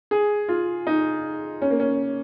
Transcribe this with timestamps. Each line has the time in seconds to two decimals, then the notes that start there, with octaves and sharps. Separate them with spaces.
0.11 G#4
0.49 F4
0.87 D#4
1.62 C#4
1.70 A#3
1.80 C#4